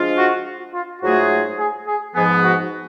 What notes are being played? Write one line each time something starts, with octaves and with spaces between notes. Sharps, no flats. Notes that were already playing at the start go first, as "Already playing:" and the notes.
Already playing: F3 G#3 D4 F4 G#4
F#4
F4
G#2 F#3 A3 F4 F#4 G#4
G#4
G#4
G#2 F3 B3 G#4
F#4